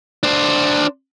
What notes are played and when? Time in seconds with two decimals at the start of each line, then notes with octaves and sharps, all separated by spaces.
0.23 D4 C5